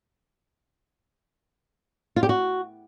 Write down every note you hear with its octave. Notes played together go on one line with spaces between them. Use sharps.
F4
G4
F#4